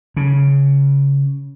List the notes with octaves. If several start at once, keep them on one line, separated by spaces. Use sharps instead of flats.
C#3